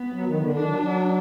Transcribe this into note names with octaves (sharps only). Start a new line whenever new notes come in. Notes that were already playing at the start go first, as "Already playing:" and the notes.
Already playing: B3
F#3
D#3
D3
D#3 D4
F#3
F#3